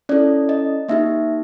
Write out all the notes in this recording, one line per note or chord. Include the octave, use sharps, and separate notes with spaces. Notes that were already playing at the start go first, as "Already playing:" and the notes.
C#4 E4 A4 D5
D#5
A#3 D#4 G4 E5